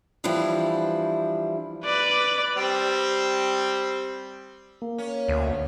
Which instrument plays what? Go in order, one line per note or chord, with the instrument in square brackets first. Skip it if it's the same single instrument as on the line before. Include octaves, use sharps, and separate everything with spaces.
[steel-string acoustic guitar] E3 F3 G3 D4 E4
[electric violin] B4 D5
[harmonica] G3 C4
[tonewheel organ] A#3
[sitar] C#4
[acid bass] D2